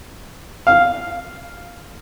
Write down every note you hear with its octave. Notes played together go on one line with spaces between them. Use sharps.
F5